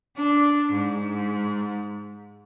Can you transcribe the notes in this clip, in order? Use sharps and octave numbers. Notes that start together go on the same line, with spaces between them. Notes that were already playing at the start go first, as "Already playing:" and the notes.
D4
G#2